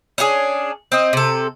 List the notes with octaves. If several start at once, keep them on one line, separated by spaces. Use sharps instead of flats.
C#4 D4 F#4 G#4
C4 D#5
C3 A4